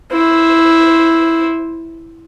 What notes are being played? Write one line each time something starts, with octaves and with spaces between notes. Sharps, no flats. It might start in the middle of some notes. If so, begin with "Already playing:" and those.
E4 C5